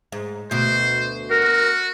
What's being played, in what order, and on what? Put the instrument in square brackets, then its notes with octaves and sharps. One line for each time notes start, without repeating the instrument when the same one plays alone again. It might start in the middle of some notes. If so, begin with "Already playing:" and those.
[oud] G#2
[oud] D2 B2 [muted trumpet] C5
[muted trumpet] F#4 [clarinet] A#4